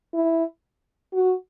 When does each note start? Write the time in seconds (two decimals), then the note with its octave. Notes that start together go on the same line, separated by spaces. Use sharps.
0.14 E4
1.14 F#4